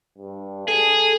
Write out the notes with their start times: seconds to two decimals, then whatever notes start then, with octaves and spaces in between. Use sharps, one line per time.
0.18 G2
0.68 G#4 A4